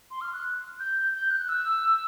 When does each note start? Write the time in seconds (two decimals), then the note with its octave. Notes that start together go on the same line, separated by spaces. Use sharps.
0.11 C6
0.21 F6
0.33 F#6
0.80 G6
1.14 G6
1.31 F#6
1.49 E6